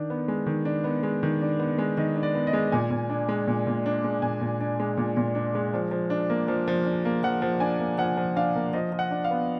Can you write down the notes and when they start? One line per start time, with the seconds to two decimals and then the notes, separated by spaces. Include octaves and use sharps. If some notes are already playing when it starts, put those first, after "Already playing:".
Already playing: D#3 D4
0.10 B3
0.28 G#3
0.46 D#3
0.65 D4
0.84 B3
1.03 G#3
1.23 D#3
1.41 D4
1.59 B3
1.78 G#3
1.97 D#3 D#5
2.16 D4
2.23 D5
2.35 B3
2.47 D#5
2.53 G#3
2.72 A#2 G#5
2.91 A#2
3.10 D4
3.29 G#3
3.48 A#2
3.67 A#2
3.86 D4
4.04 G#3
4.22 A#2 G#5
4.41 A#2
4.60 D4
4.80 G#3
4.97 A#2
5.17 A#2
5.35 D4
5.55 G#3
5.74 F3
5.91 F3
6.10 D4
6.30 A#3
6.48 F3
6.68 F3
6.85 D4
7.05 A#3
7.23 F3 F#5
7.42 F3
7.60 D4 G#5
7.80 A#3
7.98 F3 F#5
8.17 F3
8.36 D4 F5
8.55 A#3
8.73 F3 D#5
8.92 F3
8.99 F#5
9.11 D4
9.24 F5
9.31 B3